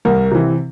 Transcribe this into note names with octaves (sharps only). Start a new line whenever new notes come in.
C2 A#4
C3 E3